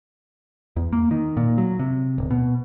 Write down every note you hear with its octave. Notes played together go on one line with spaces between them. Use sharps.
E2
A#3
D#3
A#2
F#3
C3
D1
B2